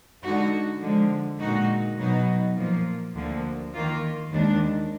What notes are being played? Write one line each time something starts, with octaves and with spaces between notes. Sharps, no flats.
D3 G#3 D#4 F#4
D3 F3 G#3
A#2 G#3 D#4 F#4
B2 F#3 B3 D#4 F#4
A#2 F3 A#3 F4
D2 D3 F3 A#3
D#3 A#3 F4
D#2 D#3 G#3 D4